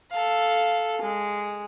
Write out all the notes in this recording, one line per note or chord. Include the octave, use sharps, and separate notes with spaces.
A4 F5
G#3